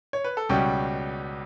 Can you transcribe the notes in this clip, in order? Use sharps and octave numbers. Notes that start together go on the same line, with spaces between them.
C#5
B4
A4
C#2 B2 G3 C#4 G4